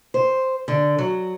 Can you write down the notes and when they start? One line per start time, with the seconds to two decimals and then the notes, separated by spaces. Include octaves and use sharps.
0.14 C5
0.68 D3
0.98 F#3